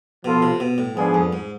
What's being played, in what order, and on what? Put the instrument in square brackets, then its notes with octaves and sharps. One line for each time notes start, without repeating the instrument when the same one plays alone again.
[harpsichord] B2 [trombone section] F3 B3 F4 A4
[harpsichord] C3
B2
A2
[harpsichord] G#2 [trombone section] F3 B3 D4 G#4
[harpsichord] F2
G#2